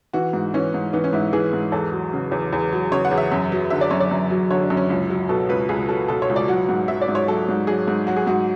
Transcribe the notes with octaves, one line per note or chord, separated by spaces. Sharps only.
E3 F#4
G#2
E3 C#4
G#2
E3 B3
C#4
G#2 E4
E3 G#4
G#2
E2 A4
F#3
C#3
E2
E2
F#3
C#3 C#5
F#5
E2
E5
F#2
F#3
D3 E5
D5
F#2 C#5
D5
F#2
F#3
D3 C#5
D4
F#2
C#4
C#2 C#4
F#3
B2 A4
C#2 B4
C#2 G#4
F#3 A4
B2 A4
C#5
C#2
D5
F#3 F#5
G#2
F#3 E5
D5
G#2
C#5
F#3 A4
G#2
F#3 G#4
G#2
F#3 F#4
G#4
G#2 F#4